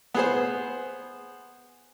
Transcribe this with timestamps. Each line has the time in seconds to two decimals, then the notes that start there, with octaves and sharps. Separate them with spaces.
0.14 B3 G#4 C5